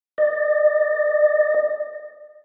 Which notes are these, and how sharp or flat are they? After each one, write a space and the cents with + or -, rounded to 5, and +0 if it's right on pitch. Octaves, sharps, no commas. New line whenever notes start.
D5 +45